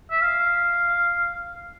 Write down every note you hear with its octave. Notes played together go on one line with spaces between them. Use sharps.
E5
F5